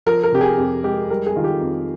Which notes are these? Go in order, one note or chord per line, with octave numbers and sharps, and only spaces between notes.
F3 A#4
A#4
C3 G4
G#4
F2 G4
G#3 G4
G3 A#4
G#4
D#3 F4
G4
F2